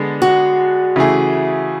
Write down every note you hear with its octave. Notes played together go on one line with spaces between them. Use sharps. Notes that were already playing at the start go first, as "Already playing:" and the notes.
Already playing: D3 G#3 B3 D4
F#4
C#3 E3 A3 E4 G#4